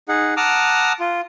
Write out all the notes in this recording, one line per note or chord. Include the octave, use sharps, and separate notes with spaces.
D#4 G#4 F#5
F#5 A5 A#5 D6 D#6 F6
F4